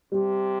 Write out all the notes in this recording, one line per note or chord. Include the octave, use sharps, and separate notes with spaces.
C3 G3